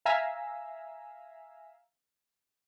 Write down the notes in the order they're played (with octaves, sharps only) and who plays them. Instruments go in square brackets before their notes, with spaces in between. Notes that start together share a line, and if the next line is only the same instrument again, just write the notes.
[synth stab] E5 F5 G#5 A#5 E6